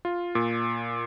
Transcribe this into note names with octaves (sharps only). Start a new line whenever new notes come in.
F4
A#2